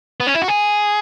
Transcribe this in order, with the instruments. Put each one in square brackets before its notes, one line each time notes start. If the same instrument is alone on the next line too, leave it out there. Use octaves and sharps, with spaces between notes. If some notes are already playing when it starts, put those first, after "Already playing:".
[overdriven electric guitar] B3
C#4
E4
F#4
G#4